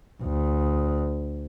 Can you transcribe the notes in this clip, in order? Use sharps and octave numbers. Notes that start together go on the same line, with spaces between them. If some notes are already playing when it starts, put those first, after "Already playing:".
D2